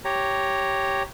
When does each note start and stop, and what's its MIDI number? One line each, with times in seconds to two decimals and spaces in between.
0.05 1.03 67
0.05 1.03 73
0.05 1.03 82